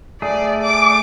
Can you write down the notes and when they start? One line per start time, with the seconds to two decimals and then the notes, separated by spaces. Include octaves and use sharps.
0.22 A3 G#4 D5
0.62 D6